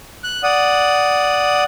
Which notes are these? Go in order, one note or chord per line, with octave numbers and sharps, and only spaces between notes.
F#6
D5 F#5 D#6